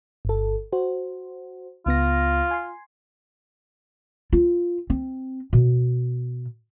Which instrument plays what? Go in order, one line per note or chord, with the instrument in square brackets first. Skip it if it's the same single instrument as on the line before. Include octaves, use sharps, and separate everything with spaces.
[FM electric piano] G1 A4
F#4 C5
[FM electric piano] C#2 B3 A#6 [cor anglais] F4
[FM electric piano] G#5 C6
[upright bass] F4
C4
B2